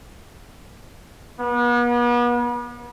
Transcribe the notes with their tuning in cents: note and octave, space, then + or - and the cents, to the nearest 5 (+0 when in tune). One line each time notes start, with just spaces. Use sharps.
B3 -40